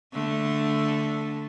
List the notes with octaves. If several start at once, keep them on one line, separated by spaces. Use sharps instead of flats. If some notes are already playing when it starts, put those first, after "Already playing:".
D3 A3 A4